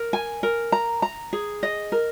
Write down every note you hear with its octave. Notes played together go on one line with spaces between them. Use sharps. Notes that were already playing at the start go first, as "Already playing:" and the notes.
Already playing: A#4
G#5
A#4
A#5
A#5
G#4
D#5
A#4